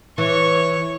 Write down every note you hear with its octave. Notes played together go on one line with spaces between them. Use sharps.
E3 C#5 C#6